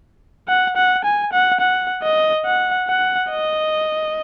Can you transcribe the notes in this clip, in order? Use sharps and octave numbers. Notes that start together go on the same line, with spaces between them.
F#5
F#5
G#5
F#5
F#5
D#5
F#5
F#5
D#5